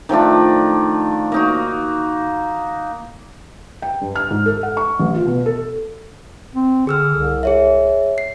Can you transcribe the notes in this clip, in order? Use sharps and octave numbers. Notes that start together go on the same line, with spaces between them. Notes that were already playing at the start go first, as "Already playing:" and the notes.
D#3 F3 A3 D4
A#3 D#4 F#4
G5
G2
F6
G#2
A4
F#5
C#6
A1
F4
B2
A4
C4
D3 G#4 E6 F6
C2
G#4 C#5 E5
C7